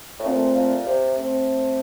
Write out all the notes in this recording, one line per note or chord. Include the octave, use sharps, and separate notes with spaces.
A2
A#2 A3 C4
A#2
C3
A3 C4